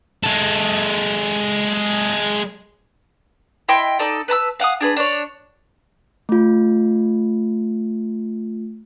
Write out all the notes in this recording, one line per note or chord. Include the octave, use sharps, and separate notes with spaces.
G#3 A4
E4 D#5 G5 C6
D#4 A4 D5
B4 A5 A#5 E6
F5 F#5 G#5 D#6
D4 G#4 B4
D4 C5 C#5
A3 F4